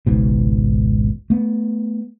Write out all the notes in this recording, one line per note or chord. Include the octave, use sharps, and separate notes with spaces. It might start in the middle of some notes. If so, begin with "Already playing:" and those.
G#1 C#2 G#2 B2
A3 B3